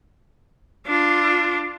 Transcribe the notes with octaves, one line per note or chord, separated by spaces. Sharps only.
D4 F4